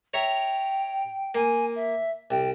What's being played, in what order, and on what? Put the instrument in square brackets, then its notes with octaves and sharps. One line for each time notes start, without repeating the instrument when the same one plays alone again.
[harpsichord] C#5 E5 A#5 [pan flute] G5
[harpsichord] A#3 [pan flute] G#5
[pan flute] E5
[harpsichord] C2 [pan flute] G5